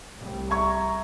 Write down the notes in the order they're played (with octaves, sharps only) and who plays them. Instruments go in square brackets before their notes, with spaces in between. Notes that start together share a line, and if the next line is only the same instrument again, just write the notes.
[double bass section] C2 A2 G3
[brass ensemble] E5 A#5 [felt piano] C#6 G#6